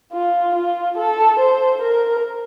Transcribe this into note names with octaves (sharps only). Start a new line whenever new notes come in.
F4
F4
A4
C5
A#4